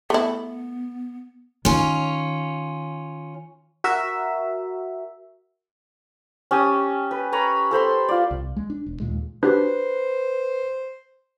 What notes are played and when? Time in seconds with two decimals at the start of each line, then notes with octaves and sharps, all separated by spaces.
0.10 A3 B3 E4
1.65 D#3 C#4 F4
3.84 F#4 A#4 E5
6.51 C#4 G4 A5 D#6
7.11 B4
7.32 B4 C#5 A#5 B5
7.71 A4 C5 B5 C6
8.09 F4 D5
8.31 C2
8.56 G#3
8.70 D4
8.86 E1
9.00 D#2 A#2 G#3
9.43 D4 F#4 G4 B4 C5